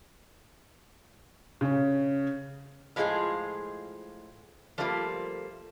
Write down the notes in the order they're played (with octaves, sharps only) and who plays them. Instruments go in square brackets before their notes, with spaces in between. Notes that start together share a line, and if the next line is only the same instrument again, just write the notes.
[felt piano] C#3 C#4
[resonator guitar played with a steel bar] A2 F3 G#3 F4 G#4
F3 G3 A3 A#3 F4